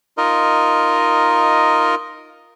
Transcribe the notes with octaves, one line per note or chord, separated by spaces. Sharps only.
D#4 F4 A#4 D#5